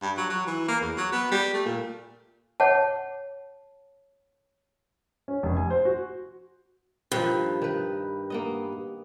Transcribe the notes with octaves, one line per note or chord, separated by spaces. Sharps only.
G2
F#3
F#3
E3
A#3
E2
F#3
B3
G3
A3
A#2
C#5 F#5 A5
C#4
F1
G#5
C5
F#4
G2 D#3 F3
D#3 B4
A#3 B3 D#5